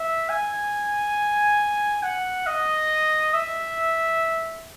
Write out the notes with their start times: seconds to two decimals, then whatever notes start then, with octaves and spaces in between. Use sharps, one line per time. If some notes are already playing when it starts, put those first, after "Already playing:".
Already playing: E5
0.29 G#5
2.03 F#5
2.47 D#5
3.34 E5